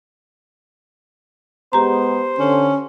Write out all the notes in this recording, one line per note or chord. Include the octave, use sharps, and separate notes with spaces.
G#3 B3 G4 C5 A#5
D3 C#4